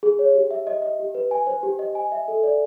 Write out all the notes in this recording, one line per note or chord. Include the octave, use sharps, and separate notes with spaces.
G#4
C#5
G4
E5
D#5
D#5
G4
B4
G#5
C5
G4
D#5
G#5
E5
A4
D5